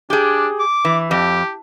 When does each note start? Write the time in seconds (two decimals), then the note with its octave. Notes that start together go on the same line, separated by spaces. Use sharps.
0.10 D4 G4 G#4
0.59 D6
0.85 E3
1.11 F2 G4